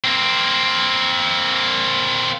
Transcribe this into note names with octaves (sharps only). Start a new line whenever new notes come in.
A#3 C4